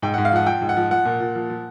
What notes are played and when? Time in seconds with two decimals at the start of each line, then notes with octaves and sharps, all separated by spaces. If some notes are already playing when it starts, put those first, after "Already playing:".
0.02 G#2 G5
0.14 G#2 F#5
0.25 F5
0.32 F3 F#5
0.46 F3 G5
0.62 G#2
0.69 F#5
0.77 F3
0.91 F3 F#5
1.05 A#2
1.20 A#2
1.35 F3
1.50 F3